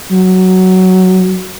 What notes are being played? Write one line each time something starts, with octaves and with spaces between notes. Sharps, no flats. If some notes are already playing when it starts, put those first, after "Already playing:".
F#3